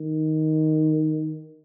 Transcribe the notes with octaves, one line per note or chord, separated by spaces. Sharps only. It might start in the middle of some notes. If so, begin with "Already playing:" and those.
Already playing: D#3